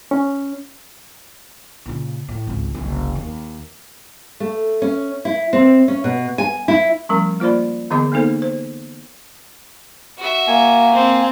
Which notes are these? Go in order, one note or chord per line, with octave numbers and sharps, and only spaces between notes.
C#4
A#2 C#3
A2
G#1 C#2
F#1 C2
D#2
A3
C#4
E4
C4
C#4
B2
G#5
E4
F3 G3 A3 C#4 A#4
A#3 F4 C5 D5 B5
D3 E3 B3 G#4 D#5 D6
A#3 B3 D#4 A4 C5
C5
F#4 E5
A#3 G#5
C4